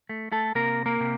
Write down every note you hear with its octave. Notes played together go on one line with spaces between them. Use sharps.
A3
A3 A4
C3 A#3 A#4
A#3 A#4
C3